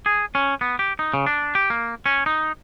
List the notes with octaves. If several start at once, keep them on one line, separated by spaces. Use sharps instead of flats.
G#4
C#4
B3
G4
D#4
C#3
D4
G4
A#3
C#4
D#4